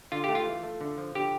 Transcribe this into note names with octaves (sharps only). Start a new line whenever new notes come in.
D3 F4
A3 G4
F4
E3
A3
D3
F3
D3 G4